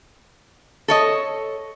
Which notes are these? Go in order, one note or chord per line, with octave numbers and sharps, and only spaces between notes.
A4 C#5 D#5